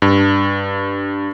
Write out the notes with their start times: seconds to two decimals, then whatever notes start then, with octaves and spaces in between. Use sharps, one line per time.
0.02 G2